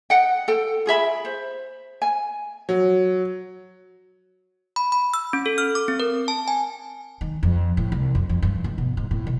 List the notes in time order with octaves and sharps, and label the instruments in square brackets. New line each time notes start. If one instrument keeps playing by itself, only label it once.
[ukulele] D#5 F#5 G5
A4 G5
F4 G#4 E5 B5
C5
G#5
[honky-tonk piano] F#3
[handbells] B5
B5
E6
C#4
A4
F6
D6
C4
A#4
A5
G#5
[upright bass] D#3
F2
A2
C2
F2
F2
G2
C#2
B2
G#2
A2
B1